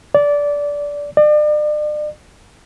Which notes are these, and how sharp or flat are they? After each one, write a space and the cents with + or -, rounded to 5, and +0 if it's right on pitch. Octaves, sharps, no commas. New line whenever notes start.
D5 -15
D5 +40